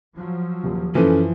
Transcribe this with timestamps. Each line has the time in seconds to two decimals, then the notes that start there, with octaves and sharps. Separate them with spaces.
0.16 F3 F#3
0.64 D#1
0.95 F#2 E3 F3 C#4 A4